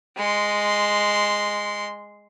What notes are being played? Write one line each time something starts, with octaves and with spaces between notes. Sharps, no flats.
G#3 C6